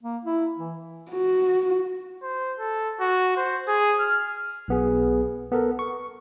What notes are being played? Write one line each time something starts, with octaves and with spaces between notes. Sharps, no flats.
A#3
E4
E3
F#4
C5
A4
F#4
C5
G#4
F6
B1 B3 G#4
B3 A4 A#4
C#6